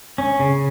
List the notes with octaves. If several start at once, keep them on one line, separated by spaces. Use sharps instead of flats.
C#4
C#3